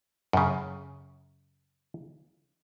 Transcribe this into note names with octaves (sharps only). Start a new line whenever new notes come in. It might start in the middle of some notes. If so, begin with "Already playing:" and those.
F#2 C#3